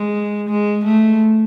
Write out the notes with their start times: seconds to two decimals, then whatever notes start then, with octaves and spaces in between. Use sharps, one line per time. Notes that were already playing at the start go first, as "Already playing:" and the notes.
Already playing: G#3
0.49 G#3
0.84 A3